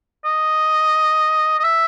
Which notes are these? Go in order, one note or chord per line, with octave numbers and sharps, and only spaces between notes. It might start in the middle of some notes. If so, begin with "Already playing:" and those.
D#5
D#5
E5